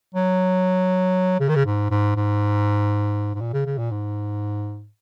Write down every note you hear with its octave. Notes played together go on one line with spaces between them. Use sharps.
F#3
C#3
D#3
C#3
G#2
G#2
G#2
G#2
A#2
C#3
C#3
A#2
G#2